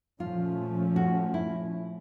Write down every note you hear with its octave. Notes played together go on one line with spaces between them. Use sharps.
A#2 F3 A3 C#4 F4
F#4
E4